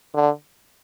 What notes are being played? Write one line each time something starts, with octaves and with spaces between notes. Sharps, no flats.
D3